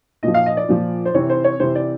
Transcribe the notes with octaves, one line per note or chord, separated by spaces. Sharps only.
A#2 F3 D#5
F5
D#5
D5
A#2 F3
C5
C3 E3 C#5
C5
C#5
C3 E3 C5
D5